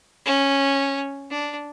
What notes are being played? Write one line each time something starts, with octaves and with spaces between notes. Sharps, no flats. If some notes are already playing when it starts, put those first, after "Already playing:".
C#4
D4